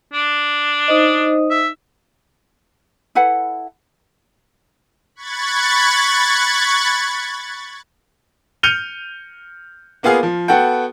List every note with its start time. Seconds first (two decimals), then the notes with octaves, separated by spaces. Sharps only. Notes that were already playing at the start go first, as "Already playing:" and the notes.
0.13 D4
0.88 D#4 C5 D#5
1.50 E5
3.15 E4 A4 B4 F#5
5.15 B5 C#6 F#6 G#6 A6
8.63 F6 G6 C#7 D#7 F7 G7
10.03 A#3 B3 F4 G#4 F5
10.23 F3
10.48 B3 F#4 A4 F#5 G5